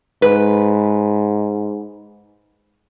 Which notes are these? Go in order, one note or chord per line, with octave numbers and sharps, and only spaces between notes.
G#2 B4